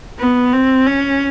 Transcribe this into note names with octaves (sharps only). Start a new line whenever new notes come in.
B3
C4
C#4